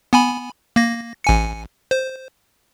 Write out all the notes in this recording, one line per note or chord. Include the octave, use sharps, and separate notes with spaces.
B3 G#5 B5
A#3 A#6
A1 G#5 C#7
C5